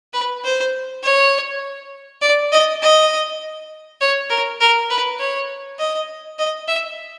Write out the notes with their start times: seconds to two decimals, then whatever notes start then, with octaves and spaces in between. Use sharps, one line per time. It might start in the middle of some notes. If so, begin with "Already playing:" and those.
0.13 B4
0.44 C5
1.03 C#5
2.21 D5
2.52 D#5
2.82 D#5
4.01 C#5
4.30 A#4
4.61 A#4
4.90 B4
5.19 C#5
5.79 D#5
6.39 D#5
6.68 E5